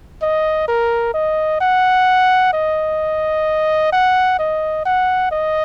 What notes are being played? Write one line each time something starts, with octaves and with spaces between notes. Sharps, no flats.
D#5
A#4
D#5
F#5
D#5
F#5
D#5
F#5
D#5